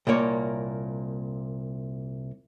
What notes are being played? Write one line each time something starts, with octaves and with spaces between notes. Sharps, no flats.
C2 A#2 A#3 C#5